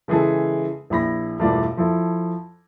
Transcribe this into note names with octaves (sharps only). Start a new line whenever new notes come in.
C#3 E3 G#3 G#4 A4
A#1 E4 B5 A#6
E1 G2 E3 A3 F4 D5
F3 E4 A4